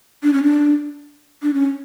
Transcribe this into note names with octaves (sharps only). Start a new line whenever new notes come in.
D4
C#4
D4
D4
C#4